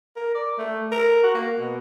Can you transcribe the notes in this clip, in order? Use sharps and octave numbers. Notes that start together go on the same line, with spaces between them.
A#4
D5
A3
A#4
F#4
A#3
B2